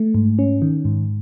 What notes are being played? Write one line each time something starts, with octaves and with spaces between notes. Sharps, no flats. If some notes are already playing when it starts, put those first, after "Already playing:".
Already playing: A3
G#2
C#4
D#3
G#2